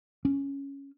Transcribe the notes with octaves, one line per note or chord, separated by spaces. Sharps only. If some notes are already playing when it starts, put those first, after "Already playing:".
C#4